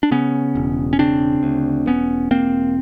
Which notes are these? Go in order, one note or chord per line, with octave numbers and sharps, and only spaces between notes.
D4
C#3 B3 C#4
E1
C#4
C#3 C4 D4
D2
E1 B3 C#4
E1 A#3 C4